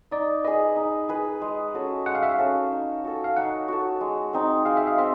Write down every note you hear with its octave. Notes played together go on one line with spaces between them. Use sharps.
D#4 D5
G#4 B4 D#5
D#4
G#4 B4
G#3
C#4 F#4 A4
G#3 F#5
F5
E5
F5
C#4 F#4 A4
D#4
F#4 A4
F5
D#4 F#5
F#4 A4
G#3
C4 D#4
G#3 F5
E5
F5
C4 E5